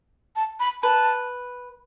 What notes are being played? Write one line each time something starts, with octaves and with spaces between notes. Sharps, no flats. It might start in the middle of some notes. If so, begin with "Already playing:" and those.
A5
B5
B4 A5